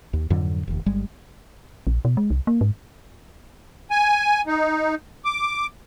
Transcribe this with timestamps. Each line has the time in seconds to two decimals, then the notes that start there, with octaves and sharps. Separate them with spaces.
0.13 D#2
0.30 F2 G#2 D3 F#3
0.68 F1 D#2
0.86 G1 G3 G#3
1.87 A#1
2.05 B2
2.17 G#3
2.30 C2
2.47 A#3
2.61 G#2
3.91 G#5
4.47 D#4
5.25 D6